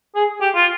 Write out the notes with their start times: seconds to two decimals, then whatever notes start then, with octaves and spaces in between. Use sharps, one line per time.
0.15 G#4
0.41 G4
0.55 F4